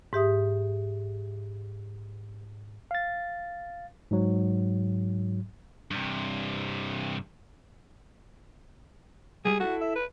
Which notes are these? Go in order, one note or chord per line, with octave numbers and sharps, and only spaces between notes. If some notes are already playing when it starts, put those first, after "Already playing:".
G#2 G4 E5 D#6
F5 A6
G#2 F#3
G2 C3
G3 G#3 G#4
E4 F#4 A4
E5
B4